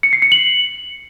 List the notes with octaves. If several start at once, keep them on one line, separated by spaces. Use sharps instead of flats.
C#7
C7
C#7
F#7